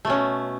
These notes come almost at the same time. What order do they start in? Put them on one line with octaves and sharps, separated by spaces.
A3 B2 C#4